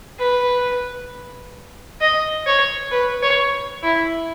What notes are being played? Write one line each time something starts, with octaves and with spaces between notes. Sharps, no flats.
B4
D#5
C#5
B4
C#5
E4